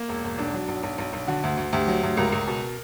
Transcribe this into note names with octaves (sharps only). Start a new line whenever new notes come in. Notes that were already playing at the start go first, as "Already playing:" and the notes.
Already playing: A#3
E1
E1
B1 D4
F#3
B1
B1
B1
B1
D3 F#4
D2
D2
D2 G4
F#3
D2
C#2 A#4
C#2
B2